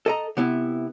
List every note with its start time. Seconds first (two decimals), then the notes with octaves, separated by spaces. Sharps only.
0.06 A4 D#5 A#5
0.37 C3 B3 E4